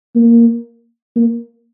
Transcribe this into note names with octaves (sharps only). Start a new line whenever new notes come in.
A#3
A#3